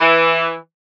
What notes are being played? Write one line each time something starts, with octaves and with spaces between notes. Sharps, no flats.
E3